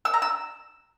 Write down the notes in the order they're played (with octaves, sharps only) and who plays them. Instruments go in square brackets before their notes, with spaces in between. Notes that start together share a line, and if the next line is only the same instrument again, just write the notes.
[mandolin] E6
A#5
E6